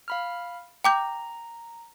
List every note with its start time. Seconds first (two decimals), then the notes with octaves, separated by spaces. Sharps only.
0.08 F5 B5 F6
0.84 G5 A#5 D6 G6